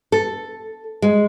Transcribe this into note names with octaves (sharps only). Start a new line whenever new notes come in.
A4
G#3